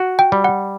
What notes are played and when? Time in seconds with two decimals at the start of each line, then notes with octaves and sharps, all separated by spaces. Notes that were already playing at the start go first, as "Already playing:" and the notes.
Already playing: F#4
0.19 G5
0.32 G3
0.44 F#5